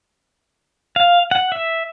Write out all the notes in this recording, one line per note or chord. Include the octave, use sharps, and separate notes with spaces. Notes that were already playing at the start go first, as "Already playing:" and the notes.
F5
F#5
E5